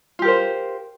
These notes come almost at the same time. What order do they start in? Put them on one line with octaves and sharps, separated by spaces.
F4 G4 A#4 C5